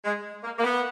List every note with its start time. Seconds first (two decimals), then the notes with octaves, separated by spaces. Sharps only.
0.05 G#3
0.44 A#3
0.59 A#3
0.64 B3